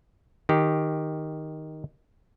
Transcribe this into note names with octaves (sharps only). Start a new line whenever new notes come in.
D#3 G4